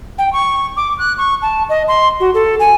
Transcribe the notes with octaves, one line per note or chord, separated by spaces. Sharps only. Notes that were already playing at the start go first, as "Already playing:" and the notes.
G5
C#6
D6
F#6
C#6
A5
D#5
C6
F#4
A4
G#5